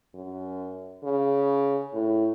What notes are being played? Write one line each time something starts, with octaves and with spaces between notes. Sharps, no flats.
F#2
C#3
A2